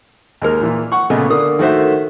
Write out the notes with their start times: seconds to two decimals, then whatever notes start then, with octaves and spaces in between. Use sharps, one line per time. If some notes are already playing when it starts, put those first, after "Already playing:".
0.42 D#2 G#3 A#4 F6
0.61 A#2 E3
0.92 F#5 C#6
1.10 A#2 C#3 A3 B3 D#5 G#5
1.30 D3 A#3 D4 D#6
1.59 D#3 A3 F#4 C5 E5